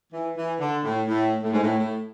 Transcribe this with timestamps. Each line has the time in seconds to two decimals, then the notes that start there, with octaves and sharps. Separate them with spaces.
0.13 E3
0.37 E3
0.60 D3
0.84 A2
1.07 A2
1.42 A2
1.53 G#2
1.63 A2
1.78 A2